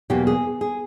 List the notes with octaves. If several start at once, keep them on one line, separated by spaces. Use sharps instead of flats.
E2 B2 F#3 A#3 G4
G#4
G#4